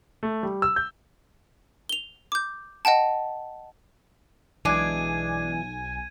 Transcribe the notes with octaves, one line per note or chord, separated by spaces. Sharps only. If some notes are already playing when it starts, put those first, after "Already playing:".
A3
G3
E6
G6
F7 G7
D6 G6
D#5 F#5 G5 A5
B1 E3 G#3 D4 G#4 G#5 G#6 D#7